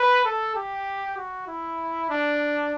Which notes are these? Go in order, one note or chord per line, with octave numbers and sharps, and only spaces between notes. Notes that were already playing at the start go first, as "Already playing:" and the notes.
Already playing: B4
A4
G4
F#4
E4
D4